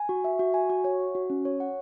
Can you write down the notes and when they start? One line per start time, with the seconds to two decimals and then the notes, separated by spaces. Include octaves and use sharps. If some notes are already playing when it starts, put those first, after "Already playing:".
Already playing: G#5
0.09 F#4
0.24 E5
0.39 F#4
0.54 G#5
0.70 F#4
0.84 C#5
1.00 F#5
1.15 F#4
1.30 C#4
1.45 C#5
1.60 F#5